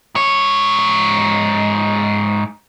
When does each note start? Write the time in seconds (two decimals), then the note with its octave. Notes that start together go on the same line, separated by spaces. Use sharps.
0.15 G#2 C#5